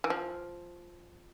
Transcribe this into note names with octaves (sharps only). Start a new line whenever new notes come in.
E3
F3